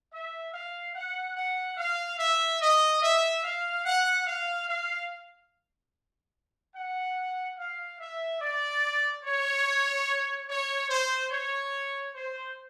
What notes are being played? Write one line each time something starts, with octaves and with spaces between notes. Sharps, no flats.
E5
F5
F#5
F#5
F5
E5
D#5
E5
F5
F#5
F5
F5
F#5
F5
E5
D5
C#5
C#5
C5
C#5
C5